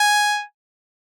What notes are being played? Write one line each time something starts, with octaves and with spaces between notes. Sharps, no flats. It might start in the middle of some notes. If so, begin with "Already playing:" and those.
Already playing: G#5